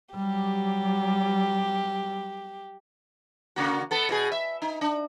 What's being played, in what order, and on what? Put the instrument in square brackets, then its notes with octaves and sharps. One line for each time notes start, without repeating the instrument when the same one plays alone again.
[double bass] F#3 G3 [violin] G4
[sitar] C#3 A#3 F#4
B3 A4
B2 F4 G#4
E5
D#4
D4